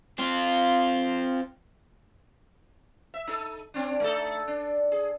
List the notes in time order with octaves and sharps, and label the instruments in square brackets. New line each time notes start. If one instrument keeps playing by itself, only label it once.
[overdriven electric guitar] C4 F4
[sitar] E5
D#4 A4
C4 D4
A3 D#4 A4
D4
G#4